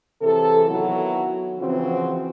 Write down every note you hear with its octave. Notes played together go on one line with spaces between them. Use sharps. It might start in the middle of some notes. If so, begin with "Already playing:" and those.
C3 E3 G#4 A4
D#3 F#3 B3 E4 F#4
C#3 E3 F3 C4 F#4 C5